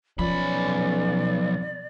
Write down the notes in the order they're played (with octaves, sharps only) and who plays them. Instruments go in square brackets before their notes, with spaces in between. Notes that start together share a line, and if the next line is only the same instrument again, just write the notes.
[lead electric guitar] B1 B5 [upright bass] F3 [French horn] C#4 [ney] D5